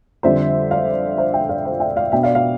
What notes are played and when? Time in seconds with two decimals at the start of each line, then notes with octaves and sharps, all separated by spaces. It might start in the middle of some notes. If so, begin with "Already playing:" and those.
0.23 F2 D3 G3 C4 C5 E5
0.71 D5 F5
1.17 C5 E5
1.34 E5 G5
1.49 D5 F5
1.65 C5 E5
1.80 E5 G5
1.97 D5 F5
2.12 B2 B3 D4 E5 G5
2.23 D5 F5
2.35 D5 F5